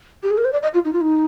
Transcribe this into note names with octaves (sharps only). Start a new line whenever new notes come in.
G4
G#4
A#4
C5
D5
D#5
F4
D#4
F4
D#4